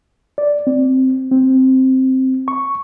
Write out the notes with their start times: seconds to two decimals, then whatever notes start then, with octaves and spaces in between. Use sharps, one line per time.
0.38 D5
0.67 C4
1.31 C4
2.48 C#6